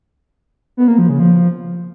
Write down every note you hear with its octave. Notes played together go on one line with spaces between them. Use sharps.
B3
A#3
F3
C#3
F3